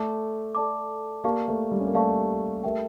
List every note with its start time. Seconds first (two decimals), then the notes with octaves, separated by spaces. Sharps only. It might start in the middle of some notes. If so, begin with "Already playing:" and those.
Already playing: A3 A4 D5 A5 D6
0.55 A4 D5 A5 D6
1.24 A#3 G4 D5 F5 A5 C#6
1.48 A3
1.72 G3
1.80 C#4
1.87 A#3
1.94 A3 G4 D5 F5 A5 C#6
2.64 A3 G4 A#4 E5 G5